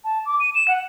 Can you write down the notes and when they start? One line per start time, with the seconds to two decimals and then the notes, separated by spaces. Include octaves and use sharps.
0.04 A5
0.26 D6
0.40 D#7
0.55 E7
0.68 F#5